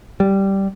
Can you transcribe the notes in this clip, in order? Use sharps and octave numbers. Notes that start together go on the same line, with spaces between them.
G3